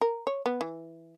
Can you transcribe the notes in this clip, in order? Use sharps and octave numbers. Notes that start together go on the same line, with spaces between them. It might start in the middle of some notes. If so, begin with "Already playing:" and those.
A#4
C#5
B3
E3